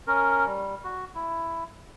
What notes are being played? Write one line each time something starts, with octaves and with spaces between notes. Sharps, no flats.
C#4 A#4
G3
F#4
E4